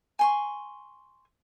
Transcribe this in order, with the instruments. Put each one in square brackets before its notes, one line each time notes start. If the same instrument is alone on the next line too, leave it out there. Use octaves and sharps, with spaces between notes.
[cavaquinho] G#5 C6 C#6